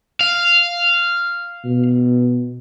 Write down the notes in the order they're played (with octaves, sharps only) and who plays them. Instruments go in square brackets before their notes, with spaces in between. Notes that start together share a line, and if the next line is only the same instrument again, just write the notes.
[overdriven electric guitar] F5
[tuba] B2